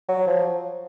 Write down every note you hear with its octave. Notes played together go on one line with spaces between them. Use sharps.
F#3
F3